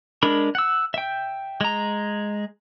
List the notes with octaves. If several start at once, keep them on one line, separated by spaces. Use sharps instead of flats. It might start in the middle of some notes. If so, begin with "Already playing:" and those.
G#3 D4 A#4 B5
F#5 E6
E5 G5
G#3 A#5